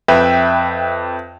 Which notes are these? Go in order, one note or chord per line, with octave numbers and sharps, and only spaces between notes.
F2 B4 E5 G5